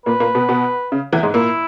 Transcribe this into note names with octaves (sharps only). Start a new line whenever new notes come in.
A#2 A#3 B4
A#2 A#3
B2 B3
B2 B3
C#3
E2 E3
G#2 G#3
A#2 A#3 E4